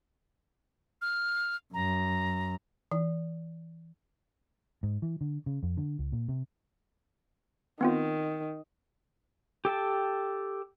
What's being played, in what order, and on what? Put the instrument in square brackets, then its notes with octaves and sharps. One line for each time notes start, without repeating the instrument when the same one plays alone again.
[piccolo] F6
[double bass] F#2 [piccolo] A#5
[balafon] E3
[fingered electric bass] G#2
E3
D3
C#3
F2
D3
C#2
A#2
C3
[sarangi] D#3 [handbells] B3 C4 F4
[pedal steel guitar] G4 A4 G5 A5